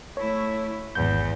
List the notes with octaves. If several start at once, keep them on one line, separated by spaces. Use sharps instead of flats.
A3 E4 C#5
G#1 E2 G6